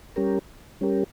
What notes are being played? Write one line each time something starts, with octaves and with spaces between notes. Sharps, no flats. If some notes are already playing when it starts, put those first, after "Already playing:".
G3 C#4 G4 A#4
G3 C#4 G4 A#4